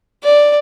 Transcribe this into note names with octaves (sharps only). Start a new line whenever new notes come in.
D5